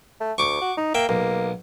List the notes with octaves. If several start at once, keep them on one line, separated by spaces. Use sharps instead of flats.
A3
D2 C#6 D6
F#4
D#4
A#3 E5 G5
B1 A#3